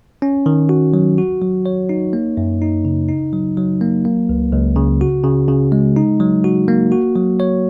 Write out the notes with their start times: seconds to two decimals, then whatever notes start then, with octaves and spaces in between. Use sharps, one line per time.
0.22 C#4
0.46 D#3
0.69 F#4
0.94 F#3
1.18 F#4
1.42 F#3
1.66 C#5
1.89 D#4
2.13 A#3
2.37 F#2
2.62 D#4
2.85 C#3
3.09 D#4
3.33 F#3
3.57 F#3
3.81 A#3
4.05 A#3
4.29 C#2
4.52 C#2
4.76 C#3
5.01 F#4
5.24 C#3
5.48 C#3
5.72 G#3
5.96 D#4
6.20 F#3
6.44 F#4
6.68 A#3
6.92 F#4
7.16 F#3
7.40 C#5